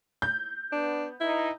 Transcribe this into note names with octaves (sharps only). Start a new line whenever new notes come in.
G6
B3 D4
E3 D#4 E4